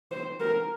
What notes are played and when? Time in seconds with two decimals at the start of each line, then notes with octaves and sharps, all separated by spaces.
0.12 C5
0.40 A#4